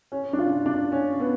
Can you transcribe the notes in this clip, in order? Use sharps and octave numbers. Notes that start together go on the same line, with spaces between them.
C#4
D4
F4
D4
C#4
B3